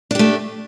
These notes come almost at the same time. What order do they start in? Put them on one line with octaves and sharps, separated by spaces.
D4 G4 A3